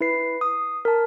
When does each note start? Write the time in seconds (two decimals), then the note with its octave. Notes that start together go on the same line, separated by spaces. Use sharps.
0.01 E4 B4 C7
0.41 D#6
0.85 A#4 A5